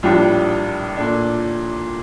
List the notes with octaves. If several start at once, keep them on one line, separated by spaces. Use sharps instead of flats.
A#1 A2 G3 D4 F4
A#2 A3 D4